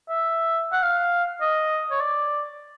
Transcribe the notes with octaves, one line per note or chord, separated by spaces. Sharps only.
E5
F#5
F5
D#5
C#5
D5